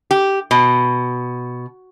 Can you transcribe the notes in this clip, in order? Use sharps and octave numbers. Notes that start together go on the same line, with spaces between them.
G4
B2